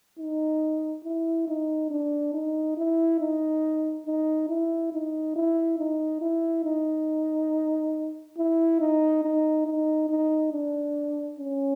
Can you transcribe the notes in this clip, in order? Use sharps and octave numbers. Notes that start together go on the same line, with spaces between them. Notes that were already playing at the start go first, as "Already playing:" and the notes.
D#4
E4
D#4
D4
D#4
E4
D#4
D#4
E4
D#4
E4
D#4
E4
D#4
E4
D#4
D#4
D#4
D#4
D4
C#4